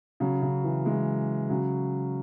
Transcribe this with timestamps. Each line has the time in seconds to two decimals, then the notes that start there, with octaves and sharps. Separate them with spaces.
0.20 C#3 F#3
0.42 C#3
0.64 E3
0.85 E3 G#3
1.50 C#3 F#3